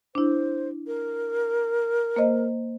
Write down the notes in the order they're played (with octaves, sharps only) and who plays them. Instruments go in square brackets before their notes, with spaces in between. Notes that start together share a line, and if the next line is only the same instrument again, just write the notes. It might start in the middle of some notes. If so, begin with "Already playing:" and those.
[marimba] D4 E4 [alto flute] C5
[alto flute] A#4
[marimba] A#3 C5 D#5